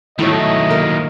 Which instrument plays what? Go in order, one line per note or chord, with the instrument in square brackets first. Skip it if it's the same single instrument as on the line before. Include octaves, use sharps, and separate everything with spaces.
[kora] A2 C#5 [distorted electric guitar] D#3 F#3 [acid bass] A3 [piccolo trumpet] D#5
[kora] A#3 A#4